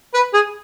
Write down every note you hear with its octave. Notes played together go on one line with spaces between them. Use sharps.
B4
G#4